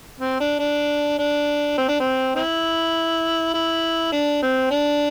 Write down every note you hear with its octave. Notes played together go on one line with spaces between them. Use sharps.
C4
D4
D4
D4
C4
D4
C4
C4 E4
E4
D4
C4
D4